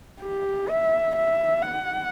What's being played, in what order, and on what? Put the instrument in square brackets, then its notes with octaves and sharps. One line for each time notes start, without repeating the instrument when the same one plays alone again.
[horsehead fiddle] G4
E5
E5
F#5